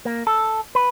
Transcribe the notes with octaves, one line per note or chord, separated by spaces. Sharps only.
A#3
A4
B4